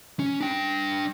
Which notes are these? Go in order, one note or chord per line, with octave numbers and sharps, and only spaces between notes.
C#4
D4 G5